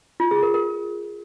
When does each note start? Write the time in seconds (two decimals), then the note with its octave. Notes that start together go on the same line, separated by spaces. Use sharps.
0.20 F4
0.31 G#4
0.43 A#4
0.54 A#4